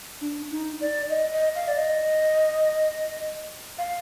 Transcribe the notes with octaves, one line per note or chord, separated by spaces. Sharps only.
D4
D#4
D5
D#5
D#5
F5
D5
D#5
F5